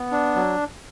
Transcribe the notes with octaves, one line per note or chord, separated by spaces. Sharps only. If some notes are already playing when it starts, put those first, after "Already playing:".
Already playing: B3
D4
F#3